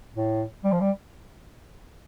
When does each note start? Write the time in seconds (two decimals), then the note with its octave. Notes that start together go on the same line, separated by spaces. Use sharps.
0.15 A2
0.64 G3
0.72 F3
0.80 G3